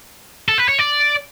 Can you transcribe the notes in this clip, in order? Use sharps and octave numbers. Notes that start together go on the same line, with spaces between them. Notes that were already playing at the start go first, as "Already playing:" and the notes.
A4
B4
C#5
D5